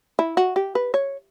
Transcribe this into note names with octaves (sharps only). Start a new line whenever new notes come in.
E4
F#4
G4
B4
C#5